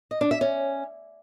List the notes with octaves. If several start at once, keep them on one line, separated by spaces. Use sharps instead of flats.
D#5
D4
E5
C#4